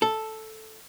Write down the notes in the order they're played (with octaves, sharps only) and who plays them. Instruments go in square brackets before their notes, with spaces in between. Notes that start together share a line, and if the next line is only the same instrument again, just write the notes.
[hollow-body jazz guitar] A4